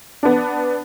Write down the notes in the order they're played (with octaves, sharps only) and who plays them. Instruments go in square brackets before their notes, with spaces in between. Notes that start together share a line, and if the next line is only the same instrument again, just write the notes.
[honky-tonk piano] B3 D4